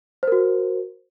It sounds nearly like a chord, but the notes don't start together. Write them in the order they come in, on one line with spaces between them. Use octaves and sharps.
C5 A#4 F#4